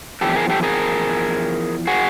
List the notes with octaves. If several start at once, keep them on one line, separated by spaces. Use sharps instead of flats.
E2 C3 F3 G4 A4
G#4 A#4
G4 A4
G#4 A#4
F#4 G#4